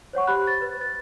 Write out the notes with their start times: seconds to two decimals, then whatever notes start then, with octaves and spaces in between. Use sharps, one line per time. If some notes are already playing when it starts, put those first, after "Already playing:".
0.13 C5 C#5 F#5 C#6
0.27 G4 C5 B5 F#6
0.47 A6
0.62 B4
0.81 A6